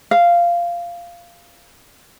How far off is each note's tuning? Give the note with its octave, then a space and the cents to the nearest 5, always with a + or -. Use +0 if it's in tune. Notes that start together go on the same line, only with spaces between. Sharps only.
F5 -10